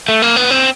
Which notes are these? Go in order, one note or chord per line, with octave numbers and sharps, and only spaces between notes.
A3
A#3
B3
C4